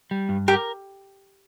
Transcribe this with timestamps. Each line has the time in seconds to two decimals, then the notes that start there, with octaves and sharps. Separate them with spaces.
0.11 G3
0.29 G2
0.48 G4 A#4